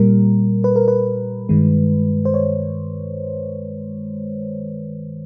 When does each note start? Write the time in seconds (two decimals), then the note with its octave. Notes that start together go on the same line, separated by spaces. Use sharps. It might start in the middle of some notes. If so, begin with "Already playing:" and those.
Already playing: A#2 G3 A#4
0.64 B4
0.76 A#4
0.88 B4
1.49 G2 D#3 G#3
2.25 C5
2.34 C#5